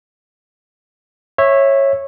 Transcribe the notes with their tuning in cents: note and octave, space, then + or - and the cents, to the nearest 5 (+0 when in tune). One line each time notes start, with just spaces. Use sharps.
C#5 -15 E5 +0